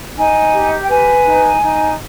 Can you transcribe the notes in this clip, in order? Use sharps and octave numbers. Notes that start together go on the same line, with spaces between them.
D#4 G#5
G4
G5
B4 G#5
D#4
D#4